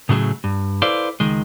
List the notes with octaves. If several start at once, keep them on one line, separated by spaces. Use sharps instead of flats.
A2 C#3 F#3 A3 G#4
G2
E4 A4 B4 C5 D5 F5
C#2 D#3 G#3